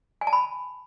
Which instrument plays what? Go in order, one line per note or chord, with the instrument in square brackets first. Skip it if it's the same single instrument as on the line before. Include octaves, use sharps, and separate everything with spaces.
[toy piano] G#5
A5
B5